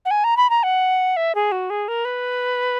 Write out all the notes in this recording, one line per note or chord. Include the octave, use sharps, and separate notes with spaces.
F#5
G#5
A#5
B5
A#5
F#5
E5
G#4
F#4
G#4
A#4
B4